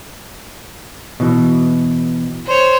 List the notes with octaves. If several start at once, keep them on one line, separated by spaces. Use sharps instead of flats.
B2 E3
C5 C#5